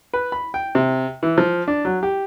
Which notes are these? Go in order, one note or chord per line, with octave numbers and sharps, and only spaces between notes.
B4
B5
G5
C3
E3
F3
D4
F#3
G4